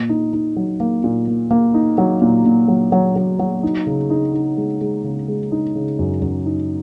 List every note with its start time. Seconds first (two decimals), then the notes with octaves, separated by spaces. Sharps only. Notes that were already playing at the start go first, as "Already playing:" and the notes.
Already playing: A#2
0.09 D#4
0.33 D#4
0.56 F#3
0.80 A#3
1.04 A#2
1.27 A#3
1.51 A#3
1.74 D#4
1.98 F#3
2.22 A#2
2.45 A#2
2.68 F#3
2.92 F#3
3.16 F#3
3.39 F#3
3.63 D#4
3.87 C#3
4.10 D#4
4.34 D#4
4.57 G#3
4.81 G#3
5.04 C#3
5.28 G#3
5.52 D#4
5.75 C#3
5.99 F#2
6.22 F#2
6.46 D#4